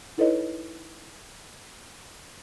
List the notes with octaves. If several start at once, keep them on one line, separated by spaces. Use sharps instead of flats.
D#4 E4 A4 B4 C#5 D#5